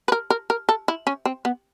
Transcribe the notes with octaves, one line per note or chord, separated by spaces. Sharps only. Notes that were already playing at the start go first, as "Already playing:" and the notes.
B4
A#4
A#4
A#4
A4
E4
C#4
C4
B3